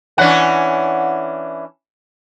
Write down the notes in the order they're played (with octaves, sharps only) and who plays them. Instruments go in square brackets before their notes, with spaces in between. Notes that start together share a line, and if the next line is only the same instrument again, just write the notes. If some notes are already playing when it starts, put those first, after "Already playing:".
[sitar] E3 C#4 D4 [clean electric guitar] F#5